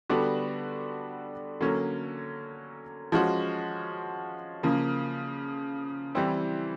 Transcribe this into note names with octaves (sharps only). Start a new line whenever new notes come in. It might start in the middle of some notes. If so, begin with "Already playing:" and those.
D3 G3 B3 D4 F#4
D3 F#3 A#3 C#4
F3 G#3 C#4 F#4
C#3 F3 A#3
E3 G3 C4 E4